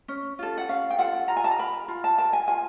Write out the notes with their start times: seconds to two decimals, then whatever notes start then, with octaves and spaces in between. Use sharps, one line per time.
0.08 C#4
0.39 F4 A4
0.58 F#5
0.69 C#4 F5
0.90 G5
0.98 F4 A4 F#5
1.28 F4 A#5
1.37 G#5
1.44 A5
1.51 A#5
1.59 A#4 B5
1.88 F4
2.04 A5
2.18 A#4 A5
2.33 G#5
2.48 F4 G#5